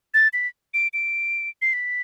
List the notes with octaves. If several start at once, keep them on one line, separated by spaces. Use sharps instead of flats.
A6
B6
D7
D7
C7
B6